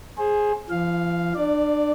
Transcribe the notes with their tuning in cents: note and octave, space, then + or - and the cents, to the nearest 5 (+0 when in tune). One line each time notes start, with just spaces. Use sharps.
G#4 +5 C5 +30
F3 -40 F5 +0
D4 +30 D5 +0